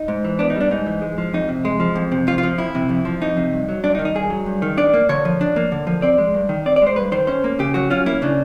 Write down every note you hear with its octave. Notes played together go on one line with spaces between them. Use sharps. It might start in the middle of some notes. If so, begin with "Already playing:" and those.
Already playing: D#4
G#2
E3
B3 D4
D#4
G3 D4
G#2 D#4
E3
G#3
F3
F2 D#4
C3
G#3
F3
F2
C3
F2 F4
F4
F3
F2 E4
C3
F2
F3
F2 D#4
C3
G2
F#3
G2 D4
D#4
D#3
D#4
G2 G#4
F#3
G2
D#3
D4 D5
A#3
D3 C#5
F3
D4
A#3
D3
F3
C4 D5
G#3
G2
D#3
C4 D5
D5
G#3
C5
G2 B4
D#3 C5
C#4 C5
A#3
C#3 G4
F#3 F#4
C#4 F4
A#3 E4
C#3 D4